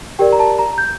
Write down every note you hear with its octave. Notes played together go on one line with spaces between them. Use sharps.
G4 A#4 D5 G5
A#5
A5
A#5
G6